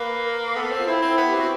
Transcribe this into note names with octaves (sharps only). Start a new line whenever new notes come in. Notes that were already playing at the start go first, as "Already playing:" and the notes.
Already playing: A#3 B4
A#4
B3 A4
C4
F4
C4 E4
C4
B3
G4
C4 F#4